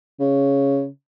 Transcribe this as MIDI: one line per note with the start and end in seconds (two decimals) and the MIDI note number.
0.20 0.87 49